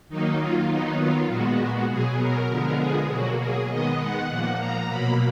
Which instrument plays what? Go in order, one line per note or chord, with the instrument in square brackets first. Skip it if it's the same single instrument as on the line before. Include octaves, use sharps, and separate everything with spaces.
[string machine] D#3 F#3 A#3 D#4
F4
D#3 F#3 B3 D#4
F4
A#2 G#3 B3 F#4
B2 F#3 B3 G#4
A#4
D3 F3 G#3 B3
G#4
B2 F#3 A#3 F#4
G#4
D#3 G#3 B3 D#5
F#5
A#2 F3 A#3
A#5
B2 F#3 A#3 B5